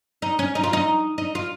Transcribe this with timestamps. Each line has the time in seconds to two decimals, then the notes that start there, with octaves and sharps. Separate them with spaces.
0.22 D#4
0.39 C#4
0.55 D#4
0.64 F4
0.73 D#4
1.18 D#4
1.35 F4